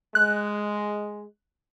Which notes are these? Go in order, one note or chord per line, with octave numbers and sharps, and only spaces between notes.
G#3 F#6